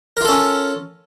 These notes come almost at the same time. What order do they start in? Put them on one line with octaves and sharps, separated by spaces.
A#4 F4 A4 C#4